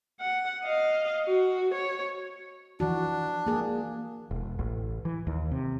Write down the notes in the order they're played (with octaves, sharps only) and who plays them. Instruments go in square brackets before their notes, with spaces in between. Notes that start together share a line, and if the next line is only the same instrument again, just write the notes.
[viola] F#5
D#5 F5
F#4
C#5
[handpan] E3 F3 F#4 [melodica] D4
[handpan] A#3 G#4
[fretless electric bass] E1
A1
E3
D#2
C3